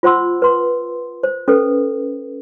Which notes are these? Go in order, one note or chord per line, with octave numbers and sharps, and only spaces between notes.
F4 C5 F#5 C6 E6
B4 C6
C5
C#4 A4 B4